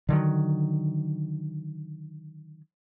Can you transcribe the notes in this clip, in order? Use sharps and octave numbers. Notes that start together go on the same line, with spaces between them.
D3 D#3 F#3